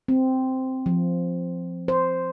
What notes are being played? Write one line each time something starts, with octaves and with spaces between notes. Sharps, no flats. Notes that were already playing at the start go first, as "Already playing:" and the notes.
C4
F3
C5